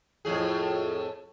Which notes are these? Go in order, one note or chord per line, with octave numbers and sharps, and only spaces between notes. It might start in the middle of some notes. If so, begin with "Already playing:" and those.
F2 A2 G#4